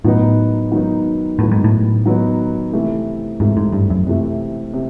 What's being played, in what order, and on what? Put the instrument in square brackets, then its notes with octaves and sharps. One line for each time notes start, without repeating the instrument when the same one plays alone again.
[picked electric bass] A2 [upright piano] D#3 F#3 B3 D#4
[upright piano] D#3 F#3 B3 D#4
[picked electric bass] A2 [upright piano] D#3 F#3 B3 D#4
[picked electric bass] G#2
A2
[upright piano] D#3 F#3 B3 D#4
C3 E3 A3
[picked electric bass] G#2 [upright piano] C3 E3 A3
[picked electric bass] G#2
G2
F#2
[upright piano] C3 E3 A3
C3